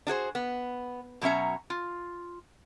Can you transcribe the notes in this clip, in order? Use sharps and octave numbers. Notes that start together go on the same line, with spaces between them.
D4 F#4 G#4 C5
B3
B2 F#3 C#4 E5 A#5
F4